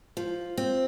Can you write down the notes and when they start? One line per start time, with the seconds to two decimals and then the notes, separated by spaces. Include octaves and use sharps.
0.17 F3
0.57 C4